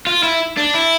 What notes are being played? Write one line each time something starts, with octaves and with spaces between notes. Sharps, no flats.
F4
E4
D4
E4